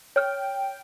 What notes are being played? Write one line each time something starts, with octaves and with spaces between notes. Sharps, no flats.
C#5 G5 F6